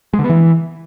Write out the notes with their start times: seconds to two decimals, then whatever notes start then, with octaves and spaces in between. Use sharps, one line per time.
0.13 G#3
0.19 D3
0.24 B3
0.30 E3